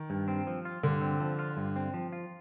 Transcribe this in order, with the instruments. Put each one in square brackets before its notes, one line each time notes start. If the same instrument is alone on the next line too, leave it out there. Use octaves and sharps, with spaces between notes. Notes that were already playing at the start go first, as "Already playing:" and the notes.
Already playing: [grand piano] D#3
[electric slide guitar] G2
C4
F3
F4
[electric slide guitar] G2 [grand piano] D3
[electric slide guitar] C4
F3
F4
G2
C4
F3
F4